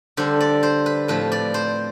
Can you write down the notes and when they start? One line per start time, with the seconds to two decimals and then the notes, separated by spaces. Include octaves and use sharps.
0.17 D3 G3 D4 C5
0.40 D5
0.63 C5
0.86 B4
1.08 A2 F3 C4 B4
1.32 D5
1.54 C5